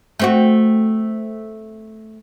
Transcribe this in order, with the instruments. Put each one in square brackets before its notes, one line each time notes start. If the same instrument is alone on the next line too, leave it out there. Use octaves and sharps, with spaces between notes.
[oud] A3 C4 F#4